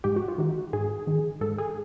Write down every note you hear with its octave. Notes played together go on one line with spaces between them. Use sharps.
G#2 G4
F#4
F4
D#3 F#4
G#2 G#4
D#3
G#2 A4
G#4